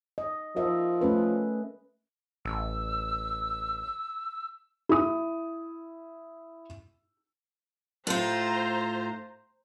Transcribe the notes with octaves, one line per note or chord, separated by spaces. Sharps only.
D#5
F3 A#4 D#5 E5
A3 C#4 B4
A1 E6
E4 D#6
A2 F4 C5 A#5